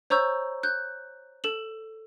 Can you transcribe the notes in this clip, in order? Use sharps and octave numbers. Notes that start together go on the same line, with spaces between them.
C5 C#5 A#5 C#6 E6 G6
F#6 G6
A4 E7 F#7